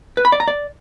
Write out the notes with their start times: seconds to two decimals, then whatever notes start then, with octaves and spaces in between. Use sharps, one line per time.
0.17 B4
0.25 B5
0.32 D5
0.40 A#5
0.48 D5